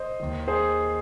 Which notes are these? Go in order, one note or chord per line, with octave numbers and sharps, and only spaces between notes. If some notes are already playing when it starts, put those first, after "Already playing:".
Already playing: C5 D#5
D#2 D#3
G#4 C5